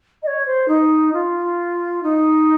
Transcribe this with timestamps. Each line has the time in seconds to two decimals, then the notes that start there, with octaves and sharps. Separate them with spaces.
0.22 D#5
0.27 C#5
0.45 C5
0.68 D#4
1.13 F4
2.03 D#4